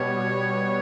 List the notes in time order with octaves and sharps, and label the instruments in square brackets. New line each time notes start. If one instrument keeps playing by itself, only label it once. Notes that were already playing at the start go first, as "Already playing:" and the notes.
Already playing: [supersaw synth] B2 G3 B3 [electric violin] C#5